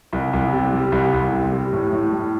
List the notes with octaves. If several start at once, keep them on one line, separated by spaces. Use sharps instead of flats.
C2
C2
C3
G3
C2
C2
C3
G3
A2
A2
G3